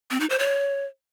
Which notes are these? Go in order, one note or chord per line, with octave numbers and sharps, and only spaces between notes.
C4
D#4
C5
C#5